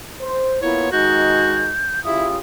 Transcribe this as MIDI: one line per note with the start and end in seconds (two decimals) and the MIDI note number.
0.21 0.59 72
0.62 0.89 58
0.62 0.89 59
0.62 0.88 64
0.62 0.89 65
0.62 0.90 73
0.92 1.71 51
0.92 1.71 56
0.92 1.71 63
0.92 1.73 66
0.92 2.03 91
2.04 2.38 49
2.04 2.27 64
2.04 2.38 65
2.04 2.38 67
2.04 2.36 87